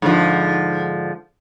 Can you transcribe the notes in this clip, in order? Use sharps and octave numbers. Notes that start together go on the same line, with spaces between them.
G#2 D3 F3